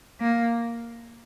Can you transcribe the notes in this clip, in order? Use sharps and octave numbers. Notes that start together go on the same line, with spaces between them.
A#3